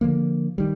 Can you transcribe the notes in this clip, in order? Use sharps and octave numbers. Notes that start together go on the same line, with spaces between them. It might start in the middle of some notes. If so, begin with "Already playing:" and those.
D3 F3 A#3
D#3 G3